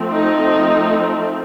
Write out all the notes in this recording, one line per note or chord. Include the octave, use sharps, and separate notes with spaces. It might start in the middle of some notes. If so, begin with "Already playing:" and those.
Already playing: F3 A3 C4
D#4